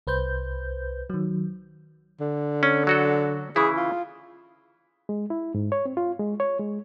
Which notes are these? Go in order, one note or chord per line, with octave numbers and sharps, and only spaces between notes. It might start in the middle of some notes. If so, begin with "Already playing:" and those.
C2 B4 C5 G6
D#3 F#3
D3
C#4
F#3 F#4 A4
C#3 E3 E4 G#4
F4
G#3
E4
G#2
C#5
C4
F4
G#3
C#5
G#3